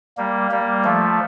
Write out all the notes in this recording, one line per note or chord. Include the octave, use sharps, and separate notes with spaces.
G3 A#3
G3 A#3
F3 A3